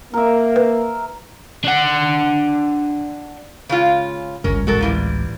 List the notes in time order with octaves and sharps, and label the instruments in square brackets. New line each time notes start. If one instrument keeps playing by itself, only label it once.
[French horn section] A#3 [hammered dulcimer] A#4 E5
[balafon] B4
[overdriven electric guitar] D4 F#5
[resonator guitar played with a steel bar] C#3 G#3 F4
[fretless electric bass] G1 C#2 G2 [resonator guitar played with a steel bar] C#4 A#4
[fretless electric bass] D1 A1 G#3 [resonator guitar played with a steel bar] F#4 A4 A#4
[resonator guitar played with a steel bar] A#2 E3 G3